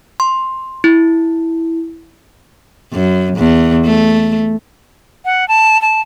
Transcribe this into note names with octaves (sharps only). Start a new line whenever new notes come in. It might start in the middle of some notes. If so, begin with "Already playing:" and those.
C6
E4
F#2
E2
A3
F#5
A5
A5